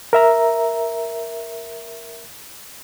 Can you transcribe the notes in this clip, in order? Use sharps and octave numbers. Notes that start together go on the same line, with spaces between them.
A#4 E5 A#5